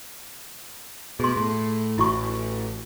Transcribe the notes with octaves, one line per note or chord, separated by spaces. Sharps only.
B2 G#4 C6
A2
A1 E4 F#4 C#6